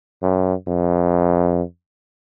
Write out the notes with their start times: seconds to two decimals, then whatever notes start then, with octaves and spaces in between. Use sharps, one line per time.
0.23 F#2
0.68 F2